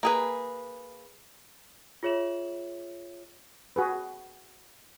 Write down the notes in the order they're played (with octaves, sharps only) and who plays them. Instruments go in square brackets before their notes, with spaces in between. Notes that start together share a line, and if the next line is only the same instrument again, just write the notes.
[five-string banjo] A#3 G#4 B4
[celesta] F4 G#4 C#5 E5 E7 F#7
[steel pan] F#4 G#4 B4